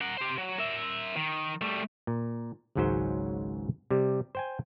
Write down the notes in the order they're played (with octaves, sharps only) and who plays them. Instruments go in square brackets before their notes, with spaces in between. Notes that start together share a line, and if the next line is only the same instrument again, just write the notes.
[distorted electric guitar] A#4 F#5
G4 C5
F#3
A#4 E5
D#3
G3 A3
[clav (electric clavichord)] A#2
G#1 C#2 G#2 F#3 C#4 C5
C3 G3
C5 G5 G#5